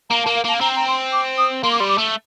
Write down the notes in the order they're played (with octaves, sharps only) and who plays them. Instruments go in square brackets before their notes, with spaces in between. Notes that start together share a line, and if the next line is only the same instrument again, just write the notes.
[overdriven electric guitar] A#3 [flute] A#5
[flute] A5
[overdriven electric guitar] A#3
[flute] F5
[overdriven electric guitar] A#3 [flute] A5
[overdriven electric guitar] C4 [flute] A#5
[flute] A#5
C6
D6
D#6
[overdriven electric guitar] A#3 [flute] C6
[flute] D6
[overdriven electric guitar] G3 [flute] C6
[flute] D6
[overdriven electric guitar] A3